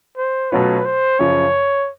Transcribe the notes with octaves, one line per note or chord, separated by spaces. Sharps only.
C5
B2 F#3 A3 C#4 F4 B4
C5
F#2 C#3 F3 C#5